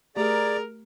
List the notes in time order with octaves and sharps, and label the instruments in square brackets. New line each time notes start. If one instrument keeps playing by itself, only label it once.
[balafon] A3 G4 [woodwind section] G#4 [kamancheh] A#4 A#5 [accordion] D5